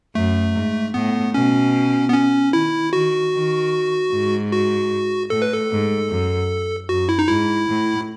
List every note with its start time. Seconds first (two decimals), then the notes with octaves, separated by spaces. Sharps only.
0.15 F#2 A3
0.55 G#2
0.94 A2 B3
1.34 B2 C#4
2.09 B3
2.14 C#4
2.53 D#3 E4
2.93 D#3 F#4
3.33 D#3
4.11 G#2
4.52 F#4
5.30 A2 A4
5.42 B4
5.53 A4
5.70 G#2
6.09 F#2
6.89 F#2 F#4
7.09 E4
7.19 D#4
7.28 G#2 E4
7.68 A2